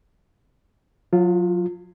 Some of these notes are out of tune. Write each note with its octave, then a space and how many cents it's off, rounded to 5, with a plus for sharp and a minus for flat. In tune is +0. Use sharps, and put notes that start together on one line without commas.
F#3 -35 F4 +0